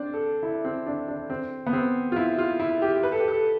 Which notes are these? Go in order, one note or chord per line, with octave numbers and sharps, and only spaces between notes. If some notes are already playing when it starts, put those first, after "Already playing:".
Already playing: C4 D4
A4
E4
C4
D4
D4
C4
B3
C4
F4
E4
F4
E4
G4
B4
A4
G4
A4